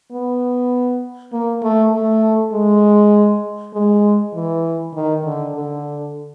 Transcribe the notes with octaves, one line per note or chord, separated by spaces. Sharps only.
B3
A#3
A3
A3
G#3
G#3
E3
D#3
D3
D3